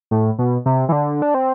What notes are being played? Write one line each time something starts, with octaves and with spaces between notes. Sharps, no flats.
A2
B2
C3
E3
D3
D4
C4